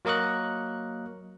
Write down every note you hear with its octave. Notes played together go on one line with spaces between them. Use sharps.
F#3 A#3 A#4 D#5 C#6 F#6